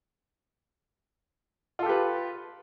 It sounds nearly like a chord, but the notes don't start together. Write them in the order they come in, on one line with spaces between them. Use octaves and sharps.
F4 A4 G4 B4